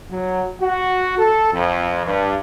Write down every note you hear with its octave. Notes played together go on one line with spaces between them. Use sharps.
F#3
F#4
A4
F2
G2